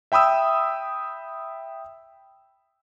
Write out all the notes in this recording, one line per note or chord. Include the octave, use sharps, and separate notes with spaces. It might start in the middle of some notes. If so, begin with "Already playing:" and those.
E5 G5 B5 D#6 E6